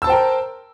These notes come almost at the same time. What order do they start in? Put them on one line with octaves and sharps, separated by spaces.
E6 A5 C5 G5 A#4